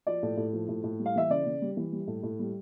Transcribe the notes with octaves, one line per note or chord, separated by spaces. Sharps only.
F3 D5
A2
A2
F3
A2
A2
G3
F5
E3 E5
C#3 D5
C#3
G3
E3
G3
A2
A2
G3